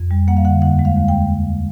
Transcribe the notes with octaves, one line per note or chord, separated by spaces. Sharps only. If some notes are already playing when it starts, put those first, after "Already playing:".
Already playing: F2
G3
A#3 F#5
F5
D3 F#5
D#2 F#5
G#3
F5
D#2
G5